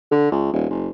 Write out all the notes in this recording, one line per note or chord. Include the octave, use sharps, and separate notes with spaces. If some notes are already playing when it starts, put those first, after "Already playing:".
D3
C#2
D#1
F#1